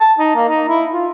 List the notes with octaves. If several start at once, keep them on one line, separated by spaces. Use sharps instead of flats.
A5
D#4
A#3
D#4
E4
F4